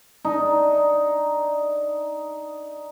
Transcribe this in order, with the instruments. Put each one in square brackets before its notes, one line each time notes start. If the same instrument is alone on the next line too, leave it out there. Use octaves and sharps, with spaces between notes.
[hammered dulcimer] D4 D#4